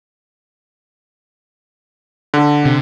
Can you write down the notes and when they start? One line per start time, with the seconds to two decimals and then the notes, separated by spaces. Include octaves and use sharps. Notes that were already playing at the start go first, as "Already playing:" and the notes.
2.34 D3
2.65 C3